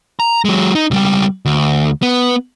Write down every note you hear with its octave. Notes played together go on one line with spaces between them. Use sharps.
A#5
F#3 G#3
D#4
C#2 G3
D2
B3